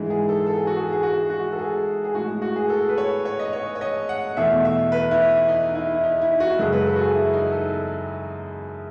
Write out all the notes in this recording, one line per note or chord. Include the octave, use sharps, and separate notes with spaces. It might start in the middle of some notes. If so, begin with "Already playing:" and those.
Already playing: G#2 E3 G#3
G#4
A4
A4
G#4
F#4
G#4
G#4
F#4
F#4
A4
G#4
G#4
A2 G#3 F#4
F#4
G#4
A4
B4
C#5
C#5
D#5
C#5
C#5
D#5
F#5
E2 B2 A3 E5
E5
B4
E4
D#4
E4
E4
D#4
E4
F#4
F#2 C#3 G#3 A4
B4
A4
F#4
G#4
E4
D#4
A4